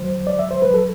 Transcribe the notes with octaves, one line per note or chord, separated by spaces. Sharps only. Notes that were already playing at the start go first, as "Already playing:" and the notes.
Already playing: E2 D3 F#3 C5
D5
E5
C5
G2 F#3 B4
A4